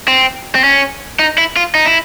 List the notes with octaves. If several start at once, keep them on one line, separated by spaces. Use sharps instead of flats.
C4
C4
C#4
D#4
E4
F4
D#4
E4